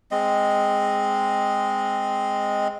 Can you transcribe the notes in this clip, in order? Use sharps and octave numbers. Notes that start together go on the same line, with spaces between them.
G#3 C4 D#5